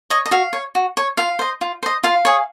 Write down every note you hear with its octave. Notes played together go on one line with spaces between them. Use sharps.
C#5 D#5
D#5
F#4 F5
C#5
F#4
C#5
F4 F5
C5 D#5
F4
C5 D#5
F4 F5
G#4 C#5